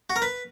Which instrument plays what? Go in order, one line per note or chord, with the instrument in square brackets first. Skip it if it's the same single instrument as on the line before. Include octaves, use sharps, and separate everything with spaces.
[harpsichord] F#4
A#4
B4